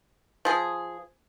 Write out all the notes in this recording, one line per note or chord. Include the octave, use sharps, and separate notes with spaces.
F3 G#4